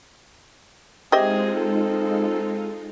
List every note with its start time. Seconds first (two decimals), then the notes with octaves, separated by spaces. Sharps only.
1.12 G#3 C4 D#4 F4 G4 G#4 D#5 E5
1.58 A4